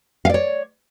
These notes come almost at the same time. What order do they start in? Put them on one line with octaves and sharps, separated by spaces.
F5 D5 C#5